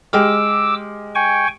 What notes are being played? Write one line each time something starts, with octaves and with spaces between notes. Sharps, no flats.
G#3 G4 D6 E6 F6
G5 G#5 C#6